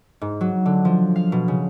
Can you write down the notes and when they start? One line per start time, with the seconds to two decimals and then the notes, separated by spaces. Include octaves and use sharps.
0.21 G#2
0.41 F#3
0.66 D3
0.85 F3
1.16 F5
1.32 B2
1.48 C#3